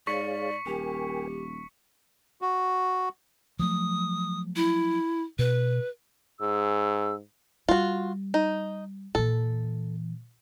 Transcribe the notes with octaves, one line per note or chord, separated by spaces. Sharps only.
G#2 G#4 C#5 D5 F5 C#6 B6 C#7
D#1 G4 A#4 G5 G#5
F#4
F3 F#3 A3 D#6
E4
B2 B4
G#2 G#4 E6
G3 F4 F#4
D#4
A#2 E3 A4